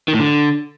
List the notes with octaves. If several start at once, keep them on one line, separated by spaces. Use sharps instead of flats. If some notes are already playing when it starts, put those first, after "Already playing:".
D#3
A2
D3